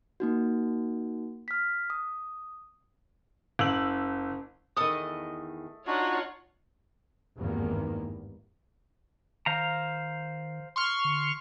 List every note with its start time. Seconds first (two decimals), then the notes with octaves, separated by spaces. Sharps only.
0.20 A#3 D#4 F#4
1.48 F6 B6
1.90 D#6
3.59 F#1 E6 F#7
4.77 E2 D#3 A3 D#5 D#6
5.87 D4 D#4 F4 F#4 C#5 F#5
7.36 G#1 E2 G2 D#3 A#3
9.46 D#3 C5 F5 A#5
10.76 C6 C#6 F6
11.05 D3